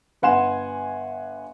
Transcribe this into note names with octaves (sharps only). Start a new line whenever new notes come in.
G1 B4 F#5 G#5 C6 E7